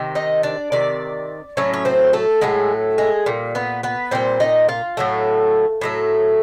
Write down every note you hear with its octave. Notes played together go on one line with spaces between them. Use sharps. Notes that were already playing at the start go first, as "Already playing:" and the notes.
Already playing: C3 D#3
D#4 D#5
D4 D5
C3 D#3 D5
A2 F#3 A3 C#4 C#5
C#5
C4 C5
A3 A4
A2 F#3 G#3 A3 G#4
G#3 G#4
A#2 G3
B3 B4
B3 B4
A#2 G3 C4 C5
D#4 D#5
F4 F5
A2 F#3 A3
A2 F#3 A3